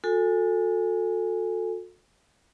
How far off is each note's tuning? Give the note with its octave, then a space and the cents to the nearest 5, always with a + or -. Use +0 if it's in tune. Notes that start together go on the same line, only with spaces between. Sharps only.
F#4 -35 A4 +10 G#5 -5